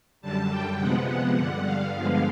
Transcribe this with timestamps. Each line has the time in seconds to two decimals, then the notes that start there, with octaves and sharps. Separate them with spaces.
0.21 F#2 D3 G3 A5
0.50 G5
0.78 C3 F3 G#3 B3 F#5
1.07 F#5
1.35 G2 D3 G3 F#5
1.64 F5
1.92 G2 D3 F3 G#3 B3